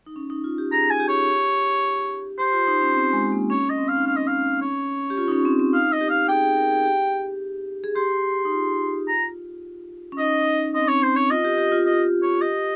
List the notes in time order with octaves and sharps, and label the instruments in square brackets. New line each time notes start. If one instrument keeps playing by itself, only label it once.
[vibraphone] D#4
C#4
D#4
F4
G4
[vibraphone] G#4 [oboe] A#5
[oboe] G#5
[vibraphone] G4
[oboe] C#5
[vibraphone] G4 [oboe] C5
[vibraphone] F4
D#4
C#4
C4
G#3
A#3
[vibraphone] C#4 [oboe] C#5
[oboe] D#5
[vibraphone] C4
[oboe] F5
[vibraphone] D#4
[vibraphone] C#4 [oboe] F5
[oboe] D#5
F5
C#5
[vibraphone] G4
F4
D#4
C#4
C4
C4
[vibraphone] D#4 [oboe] F5
[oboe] D#5
[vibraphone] G4
[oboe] F5
[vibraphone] G#4 [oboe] G5
[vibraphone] G#4
A#4
G#4
G4
G#4
[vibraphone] G4 [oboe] C6
[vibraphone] D#4
F4
[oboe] A#5
[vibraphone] C#4
[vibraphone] D#4 [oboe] D#5
[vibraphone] D#4
C#4
[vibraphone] C4 [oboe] D#5
[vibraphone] C#4
[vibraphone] C4 [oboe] C#5
[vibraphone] C#4
[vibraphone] C4 [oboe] C5
[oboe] C#5
[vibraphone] F4 [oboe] D#5
[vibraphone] G4
G4
F4
[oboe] D#5
C#5
[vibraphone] G4 [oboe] D#5